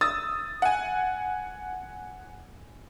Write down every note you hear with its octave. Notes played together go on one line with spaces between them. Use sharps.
D#6 E6 A6
F#5 G#5